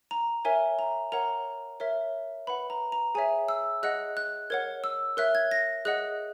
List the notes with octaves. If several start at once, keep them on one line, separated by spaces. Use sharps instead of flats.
A#5
A#4 C#5 E5 G#5
A#5
A#4 C#5 F#5 A#5
A#4 C#5 E5
B4 F#5 B5
A#5
A#5
G#4 C#5 E5 G#5
E6
G#4 D#5 F#5 F#6
F#6
A#4 C#5 F#5 G#6
E6
A#4 C#5 E5 F#6
G#6
A#6
G#4 D#5 F#5 F#6